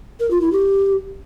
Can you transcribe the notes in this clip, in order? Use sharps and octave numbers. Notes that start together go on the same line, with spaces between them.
A#4
F4
E4
G4